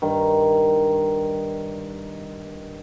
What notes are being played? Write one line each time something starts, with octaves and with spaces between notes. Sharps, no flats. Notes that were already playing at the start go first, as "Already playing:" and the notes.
G2 D#3